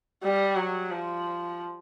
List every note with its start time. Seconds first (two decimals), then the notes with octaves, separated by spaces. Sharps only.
0.24 G3
0.56 F#3
0.91 F3